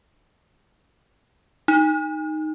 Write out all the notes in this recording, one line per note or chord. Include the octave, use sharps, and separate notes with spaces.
D#4